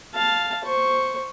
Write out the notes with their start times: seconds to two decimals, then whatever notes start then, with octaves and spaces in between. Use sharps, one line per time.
0.14 F5 A5
0.64 C5 C#6